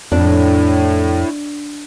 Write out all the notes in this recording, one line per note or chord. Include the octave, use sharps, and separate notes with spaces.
F2 A2 D4